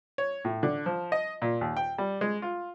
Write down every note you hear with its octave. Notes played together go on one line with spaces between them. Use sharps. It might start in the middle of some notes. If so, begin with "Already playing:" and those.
C#5
A2
D3
F3
D#5
A#2
D#2
G5
G3
G#3
F4